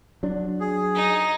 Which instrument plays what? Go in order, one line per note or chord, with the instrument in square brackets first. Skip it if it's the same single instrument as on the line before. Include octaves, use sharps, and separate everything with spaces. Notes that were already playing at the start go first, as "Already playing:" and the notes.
[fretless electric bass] F#3 D4
[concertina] G#4
[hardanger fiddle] D#4